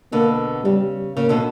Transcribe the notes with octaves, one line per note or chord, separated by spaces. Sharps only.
B2 D3 A#3
C#3 G3
C#3 A#3
B2 D3